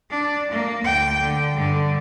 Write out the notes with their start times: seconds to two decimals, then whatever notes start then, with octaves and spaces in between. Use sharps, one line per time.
0.10 D4
0.51 A#3
0.84 D2 G5
1.21 D3
1.53 G2 D3